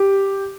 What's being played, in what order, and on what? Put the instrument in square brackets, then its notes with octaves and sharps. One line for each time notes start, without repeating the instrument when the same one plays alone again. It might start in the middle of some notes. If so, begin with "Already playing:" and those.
Already playing: [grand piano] G4